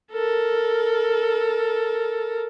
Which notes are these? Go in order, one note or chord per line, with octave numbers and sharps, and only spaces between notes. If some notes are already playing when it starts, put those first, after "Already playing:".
A4 A#4